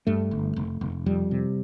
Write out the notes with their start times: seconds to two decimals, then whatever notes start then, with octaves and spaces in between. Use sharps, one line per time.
0.07 G2 A3
0.31 G1
0.56 F1
0.81 F1
1.06 F2 G3
1.31 C3